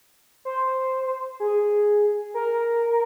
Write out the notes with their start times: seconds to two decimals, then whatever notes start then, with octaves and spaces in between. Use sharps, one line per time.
0.45 C5
1.40 G#4
2.34 A#4